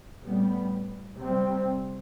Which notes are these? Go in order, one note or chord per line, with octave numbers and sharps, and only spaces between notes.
A2 G3 B3
C3 G3 C4